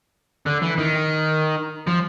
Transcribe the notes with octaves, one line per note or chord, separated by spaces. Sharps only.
D3
E3
D#3
F3